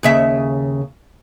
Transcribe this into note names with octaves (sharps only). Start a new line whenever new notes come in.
D#2 C#3 E5